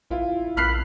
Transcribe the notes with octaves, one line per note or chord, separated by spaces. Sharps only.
A1 E4 F4
A#1 B5 F6 F#6 C7